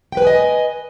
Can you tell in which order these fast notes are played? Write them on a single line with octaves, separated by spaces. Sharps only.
G5 B4 G#5 D#5